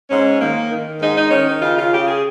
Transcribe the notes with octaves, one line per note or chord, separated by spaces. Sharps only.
G#2 C#4
D#3 A#3
D#3
G#2 D#4
D#4
D#3 C#4
D#4
C#3 F4
F4
C#3 G4
G#4